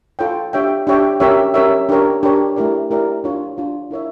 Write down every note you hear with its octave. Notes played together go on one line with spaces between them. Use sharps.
F4 A4 C#5 G5
D4 G4 C#5 E5 G5
D4 G4 C#5 E5 G5
C#4 G4 A#4 C#5 E5
C#4 G4 A#4 C#5 E5
D4 G4 A#4 C#5
D4 G4 A#4 C#5
A3 E4 G4 A#4 D5
A3 E4 G4 A#4 D5
D4 F4 C#5
D4 F4 C#5
E4 A#4 C#5 E5